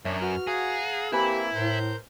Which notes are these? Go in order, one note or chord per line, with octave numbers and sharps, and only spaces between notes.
F#2 D4 C#5 E5
F#4 B4 F6
G#4 F5 F#5 A#5
A#3 C4 E4 G4 B4 G#5 B5
A2 A#4 C5 G6